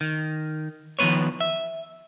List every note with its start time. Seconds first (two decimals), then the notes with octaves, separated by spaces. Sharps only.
0.01 D#3
0.99 D#3 F3 A3 B3 B4 C#5
1.40 E5